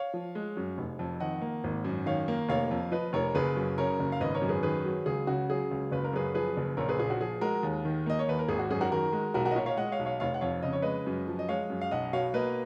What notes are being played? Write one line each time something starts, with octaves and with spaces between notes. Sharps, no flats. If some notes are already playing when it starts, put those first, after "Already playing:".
Already playing: C#5 F5
F3
G#3
F#2
F1
F2
D#3 D#5 F#5
A#3
G#1
F#2
D#3 C#5 F5
A#3
F1 C#5 F5
F2
F3 B4 D#5
F1 A#4 C#5
F#1 G#4 B4
F#2
C#3 A#4 C#5
F#1
F5
G#1 B4 D#5
A#4 C#5
F#2
G#4 B4
D#3 G#4 B4
F#3
C#2 G#4
C#3 F#4
F#3 G#4
C#2
F#1 B4
A#4
F#2 G#4 B4
F3 G#4 B4
F#1
A#1 A#4 C#5
G#4 B4
A#2 G#4
F#4
F3 G#4
G#3 F#4 A#4
D#2
D#3
A#3 D#5
C#5
D#2 B4
A#4
G#1 G#4
F#4
F#2 G#4
F#4 A#4
D#3 F#4 A#4
G#3
B1 F#4 A#4
F#4 A#4
D#5
A#2 A#4 C#5
C#5 F5
G#3 D#5 F#5
C#5 F5
B1
C#5 F5
F1 C#5 F5
F#5
F2 C#5 F5
C#3 D#5
C#5
G#3 B4 D#5
F#2
F3
D#5
G#3 C#5 F5
F#2
F5
B1 D#5 F#5
B2 C#5 F5
A#3 B4 D#5